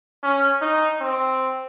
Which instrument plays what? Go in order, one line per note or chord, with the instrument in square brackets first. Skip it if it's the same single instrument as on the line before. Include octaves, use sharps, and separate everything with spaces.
[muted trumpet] C#4
D#4
C4